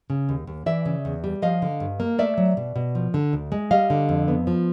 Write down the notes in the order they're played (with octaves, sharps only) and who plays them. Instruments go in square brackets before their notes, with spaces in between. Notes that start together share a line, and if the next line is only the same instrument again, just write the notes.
[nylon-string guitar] C#3
D#2
D#2
E3 D5 E5
C#3
E2
G3
F3 D#5 F5
D3
G2
A#3
A3 D5 E5
F#3
B2
B2
F3
D3
D2
G#3
G3 D#5 F5
D3
F2
B3
F3